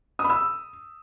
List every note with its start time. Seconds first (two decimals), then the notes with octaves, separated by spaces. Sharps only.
0.19 D#6
0.24 B5
0.30 E6